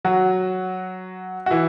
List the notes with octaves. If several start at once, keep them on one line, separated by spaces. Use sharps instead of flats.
F#3 F#4
F#4
E3 E4